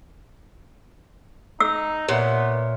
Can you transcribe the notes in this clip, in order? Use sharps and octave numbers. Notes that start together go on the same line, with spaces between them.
D#4 E6
A#2 B3 C#5 E5